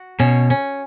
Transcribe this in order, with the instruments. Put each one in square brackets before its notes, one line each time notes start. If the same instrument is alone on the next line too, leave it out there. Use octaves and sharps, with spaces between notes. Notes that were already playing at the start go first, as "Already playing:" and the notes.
Already playing: [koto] F#4
[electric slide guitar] B2 [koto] C#4
[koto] C#4